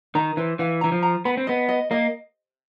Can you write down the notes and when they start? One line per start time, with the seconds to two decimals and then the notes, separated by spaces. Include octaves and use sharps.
0.15 D#3 A#5
0.37 E3 C5
0.59 E3 F5
0.81 E3 A#5
0.92 F3
1.03 A#5
1.25 B3 B5
1.37 C4
1.47 B3 D#5
1.69 D#5
1.91 A#3 D#5